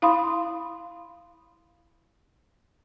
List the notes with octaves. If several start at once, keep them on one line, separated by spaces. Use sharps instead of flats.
E4 F5 B5 C6 D#6